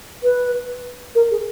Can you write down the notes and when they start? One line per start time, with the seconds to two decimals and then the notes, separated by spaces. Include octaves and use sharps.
0.23 B4
1.15 A#4
1.31 G#4